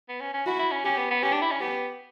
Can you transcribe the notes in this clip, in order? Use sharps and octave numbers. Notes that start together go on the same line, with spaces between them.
B3
C#4
C#4
E4 F#4
E4
C#4
C#4 G4
B3
B3
C#4 G4
D4
E4
C#4
B3 G4